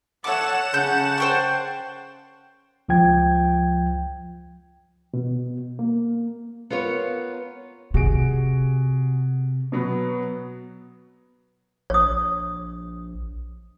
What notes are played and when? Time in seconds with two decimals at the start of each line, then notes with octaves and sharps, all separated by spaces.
0.24 A4 C#5 E5 F#5 D6 E7
0.74 C#3 C#4 A5 G6
1.18 C5 G5 C#6
2.89 C#2 F3 F4 G5 G#6
5.14 B2
5.79 A#3
6.70 B3 F4 A#4 C#5
7.94 C3 F#4 G#4 D7
9.72 B2 F#3 B3
11.90 A#1 C#5 D#6